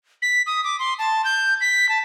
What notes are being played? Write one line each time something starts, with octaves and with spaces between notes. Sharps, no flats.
B6
D#6
D6
C6
A5
G6
B6
A5